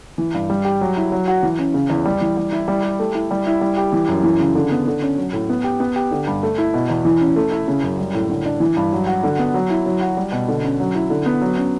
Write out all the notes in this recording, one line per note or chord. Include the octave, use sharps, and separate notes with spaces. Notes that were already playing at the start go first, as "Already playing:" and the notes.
E3
G2
G3
G4
F#3
E4
F#3
F#4
E3
C#4
C#3
E2
G3
E3
G3
E4
G3
G4
A3
E4
G3
E4
G3
G4
E3
F#2
E3
C#3
D3
B3
D3
C#4
F#3
A2
B3
G4
B3
G4
D3
G2
A3
E4
B2
E2
E3
C#4
A3
E4
C#3
F#2
G3
A2
D3
D4
E3
G2
F#3
F#4
D3
B3
F#3
E4
F#3
F#4
G3
B2
D3
C#4
F#3
E4
D3
B3
F#3
C#4